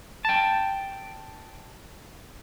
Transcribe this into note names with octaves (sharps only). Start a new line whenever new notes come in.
G5 A5